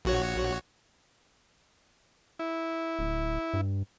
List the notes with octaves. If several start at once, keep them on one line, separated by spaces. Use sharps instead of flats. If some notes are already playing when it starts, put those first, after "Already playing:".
A#1 F#4 C#5
E4
D1
G2